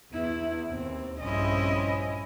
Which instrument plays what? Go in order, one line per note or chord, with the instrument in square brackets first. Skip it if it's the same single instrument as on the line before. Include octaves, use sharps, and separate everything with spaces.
[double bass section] E2 [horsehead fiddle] B3 E4
[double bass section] D#2 [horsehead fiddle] C4
[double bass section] A#1 G2 C4 [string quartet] C#4 E4 [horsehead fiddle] D#5